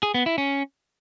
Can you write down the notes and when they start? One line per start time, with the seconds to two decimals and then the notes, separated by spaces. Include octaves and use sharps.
0.03 G#4
0.14 B3
0.26 E4
0.38 C#4